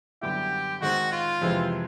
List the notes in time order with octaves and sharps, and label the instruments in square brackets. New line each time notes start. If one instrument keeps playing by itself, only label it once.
[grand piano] F#2 D3 G3 B3 E4 [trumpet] G4
[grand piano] D#3 G#3 C4 D#4 [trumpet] F#4
[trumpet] F4
[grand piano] F2 C3 E3 G#3 C4